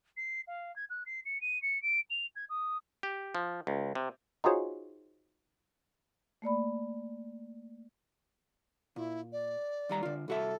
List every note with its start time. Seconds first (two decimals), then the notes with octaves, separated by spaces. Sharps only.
0.17 C7
0.47 F5
0.76 G#6
0.90 F#6
1.06 C7
1.25 C#7
1.41 D#7
1.62 C#7
1.82 D7
2.10 F7
2.36 G#6
2.49 D#6
3.03 G4
3.35 F3
3.67 C#2
3.95 C3
4.44 D#4 F4 F#4 G#4 C5 C#5
6.42 A3 A#3 D5 B5
8.96 A#2 E4
9.32 D5
9.89 D#2 G3 A#5
10.03 D3 F4
10.28 C2 F#4 A4 E5